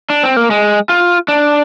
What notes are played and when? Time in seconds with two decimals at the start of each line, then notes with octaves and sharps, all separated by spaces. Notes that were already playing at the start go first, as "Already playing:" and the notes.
0.10 D4
0.23 C4
0.36 A#3
0.51 G#3
0.89 F4
1.28 D4